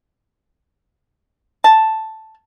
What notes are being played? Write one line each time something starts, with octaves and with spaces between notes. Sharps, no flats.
A5